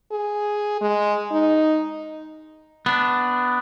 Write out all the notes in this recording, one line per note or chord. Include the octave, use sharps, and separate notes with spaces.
G#4
G#3
D#4
B3 D4